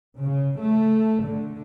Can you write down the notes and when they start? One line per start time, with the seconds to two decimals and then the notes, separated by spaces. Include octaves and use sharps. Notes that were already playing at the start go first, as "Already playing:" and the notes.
0.20 C#3
0.61 A3
1.25 D3